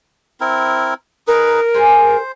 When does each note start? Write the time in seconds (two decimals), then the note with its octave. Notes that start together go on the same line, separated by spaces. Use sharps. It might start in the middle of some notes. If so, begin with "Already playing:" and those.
0.40 C4 E4 A#4
1.27 D#4 G#4 A#4 B4
1.74 G#3 G#4 C5 G#5